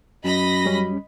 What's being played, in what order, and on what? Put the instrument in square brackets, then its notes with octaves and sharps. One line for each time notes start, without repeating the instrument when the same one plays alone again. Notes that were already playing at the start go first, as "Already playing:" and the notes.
[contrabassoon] F#2 [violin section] D#5 B5 A#6
[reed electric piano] G3 C#4